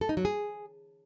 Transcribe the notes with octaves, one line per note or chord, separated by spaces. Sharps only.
A4
D#4
F#3
G#4